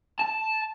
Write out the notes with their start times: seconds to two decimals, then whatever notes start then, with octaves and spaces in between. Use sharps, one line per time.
0.20 A5